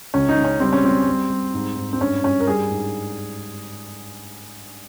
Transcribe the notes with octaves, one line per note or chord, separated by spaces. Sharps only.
C#2 C#4
D#4
C#2
C#4
G3 C4
C#4
G3 C4
G3
G3
G#2
G#2
C4
G2 C#4
G2 C#4
A#4
G3 G#4
G#2